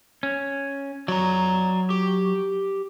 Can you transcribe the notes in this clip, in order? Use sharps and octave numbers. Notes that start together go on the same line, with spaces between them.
C#4
F#3 D5 A#5
G4